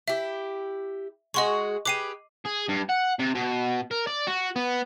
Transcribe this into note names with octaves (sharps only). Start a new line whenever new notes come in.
E4 G4 E5
G#3 F#4 G#4 D#5 C6 C#6
G4 G#4 B4 D6 C7 D#7
G#4
G2
F#5
C3
B2
A#4
D5
F#4
B3